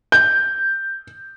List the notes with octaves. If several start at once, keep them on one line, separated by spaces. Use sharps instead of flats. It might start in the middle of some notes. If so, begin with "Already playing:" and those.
G6